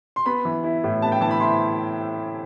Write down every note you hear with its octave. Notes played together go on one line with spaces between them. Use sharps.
C6
B3 B5
E3
E4
A2
B3 A5
G5
E3 A5
B5
E4 C6